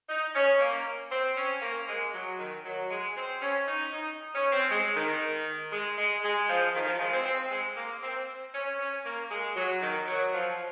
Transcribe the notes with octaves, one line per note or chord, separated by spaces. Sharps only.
D#4
C#4
A#3
C4
C#4
A#3
G#3
F#3
D#3
F#3
G#3
C4
C#4
D#4
D#4
C#4
C4
G#3
D#3
G#3
G#3
G#3
F3
D#3
F3
G#3
C4
C4
G#3
A#3
C4
C#4
C#4
A#3
G#3
F#3
D#3
F#3
F3